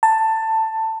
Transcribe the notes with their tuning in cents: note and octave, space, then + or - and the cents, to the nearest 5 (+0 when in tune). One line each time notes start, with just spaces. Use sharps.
A5 +15